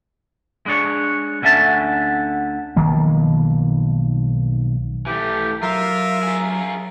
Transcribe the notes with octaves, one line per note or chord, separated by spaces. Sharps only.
G#3 D4 C#5
D2 D3 C#4 E5 A5
B1 D#3 F3 A#3
E3 A3 G4
F#3 F4 A#4 E5
F4 G#4